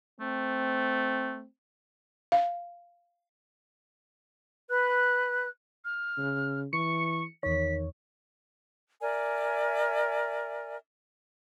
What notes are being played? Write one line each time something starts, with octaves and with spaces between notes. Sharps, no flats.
A3 C4
F5
B4 F#6
F6
C#3
E3 C#6 C#7
E2 D#3 C#5 B6
A#4 D5 E5 G#5